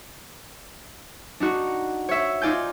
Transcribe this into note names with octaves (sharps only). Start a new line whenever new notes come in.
D4 D#4 F#4
C#5 E5
D#4 F4 D5 G#5 G6